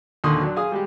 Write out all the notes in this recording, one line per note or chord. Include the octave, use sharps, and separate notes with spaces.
D#2 A#2 D3 C6 C#6 D#6
F#3 D4
G#4 F5 G#5 D#6
G3 G#3 G4